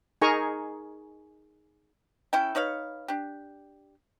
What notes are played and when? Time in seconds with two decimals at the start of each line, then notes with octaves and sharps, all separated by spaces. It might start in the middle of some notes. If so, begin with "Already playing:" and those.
0.21 D#4 G#4 A#4 G#5 A#5 C#6
2.33 C#4 E4 A4 G5
2.55 D#4 B4 C#5 F5
3.08 D4 G4